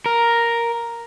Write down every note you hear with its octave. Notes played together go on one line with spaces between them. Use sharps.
A#4